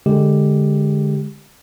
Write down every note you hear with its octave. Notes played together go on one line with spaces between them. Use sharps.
D3 G#3 G4